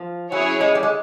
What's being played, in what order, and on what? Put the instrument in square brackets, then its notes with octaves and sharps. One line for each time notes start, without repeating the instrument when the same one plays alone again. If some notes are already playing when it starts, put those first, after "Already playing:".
Already playing: [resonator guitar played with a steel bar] F3
[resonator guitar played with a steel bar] F#3 [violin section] C#4 E4 G#4 C#5
[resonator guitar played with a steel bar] G#3
G3
G#3